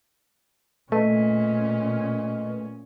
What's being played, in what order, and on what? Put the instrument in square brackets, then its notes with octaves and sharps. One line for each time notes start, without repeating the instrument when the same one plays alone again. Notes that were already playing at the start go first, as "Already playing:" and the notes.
[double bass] A#2 C#4 [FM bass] A3 [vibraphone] B4 D#5